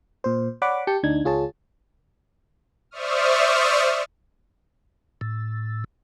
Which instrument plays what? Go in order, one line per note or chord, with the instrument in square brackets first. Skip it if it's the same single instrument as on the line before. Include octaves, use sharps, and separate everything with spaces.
[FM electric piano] A#2 C5
C#5 D5 F#5 B5 D6
G4 A5 G6 C#7
D2 D4 D#4 G#6
C#2 F4 G#4 C#5 A5
[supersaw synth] C5 D5 E5 C#6 D#6 F6
[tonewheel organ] A2